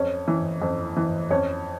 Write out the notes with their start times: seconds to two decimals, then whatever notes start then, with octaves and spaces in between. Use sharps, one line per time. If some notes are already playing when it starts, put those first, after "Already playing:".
Already playing: F2 C#4 C#5
0.28 E3
0.62 F2
0.97 E3
1.31 F2 C#4 C#5